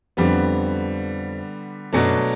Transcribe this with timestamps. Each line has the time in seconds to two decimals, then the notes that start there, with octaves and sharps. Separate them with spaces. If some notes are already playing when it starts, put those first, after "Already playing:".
0.17 F2 D3 G3 B3
1.93 F#2 B2 F#3 A3 D4